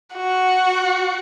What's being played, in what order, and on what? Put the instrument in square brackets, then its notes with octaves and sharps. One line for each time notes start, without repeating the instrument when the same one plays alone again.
[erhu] F#4